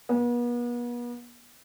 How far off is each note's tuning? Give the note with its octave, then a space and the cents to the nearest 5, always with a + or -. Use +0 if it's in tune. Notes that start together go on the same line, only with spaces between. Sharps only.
B3 -40